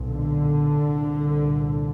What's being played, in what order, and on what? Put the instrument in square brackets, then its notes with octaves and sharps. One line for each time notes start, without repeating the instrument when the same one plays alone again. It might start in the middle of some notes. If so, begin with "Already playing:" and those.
Already playing: [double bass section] B1 A#2
D3
C2 A#2